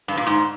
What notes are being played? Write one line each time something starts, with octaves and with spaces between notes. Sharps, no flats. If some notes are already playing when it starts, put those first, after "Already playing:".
G2
A#2
G#2